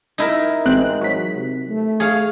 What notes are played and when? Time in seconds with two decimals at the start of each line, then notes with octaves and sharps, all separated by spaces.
0.18 D#4 E4 A#4
0.65 A1 G#3 C4 F#6
1.01 F#3 B6
1.36 C3
1.69 A3
2.00 G#4 C#5 F5